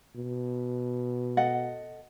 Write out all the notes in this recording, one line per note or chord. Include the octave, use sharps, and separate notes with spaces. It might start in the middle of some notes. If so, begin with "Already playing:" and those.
B2
A4 D#5 F#5